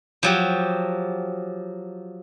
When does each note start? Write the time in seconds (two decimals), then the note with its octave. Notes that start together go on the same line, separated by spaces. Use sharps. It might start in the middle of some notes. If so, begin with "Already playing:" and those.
0.23 F3 F#3 G4